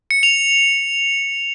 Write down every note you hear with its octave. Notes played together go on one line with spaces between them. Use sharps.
C#7
F7